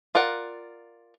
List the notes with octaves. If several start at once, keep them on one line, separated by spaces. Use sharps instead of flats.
F4 A#4 D5 F#5